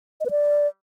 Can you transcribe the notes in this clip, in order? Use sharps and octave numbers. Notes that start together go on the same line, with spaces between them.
D#5
B4
D5